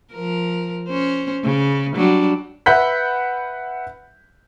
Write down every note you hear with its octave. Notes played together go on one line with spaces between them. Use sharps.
F3 A#4
C#4 C5
C#3
F#3 G3 D4
B4 E5 F#5 B5 G6 B6